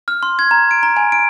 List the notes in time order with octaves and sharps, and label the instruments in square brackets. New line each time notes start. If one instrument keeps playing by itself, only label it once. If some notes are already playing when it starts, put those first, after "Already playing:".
[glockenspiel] F6
C6
G#6
A#5
D7
A#5
G#5
D7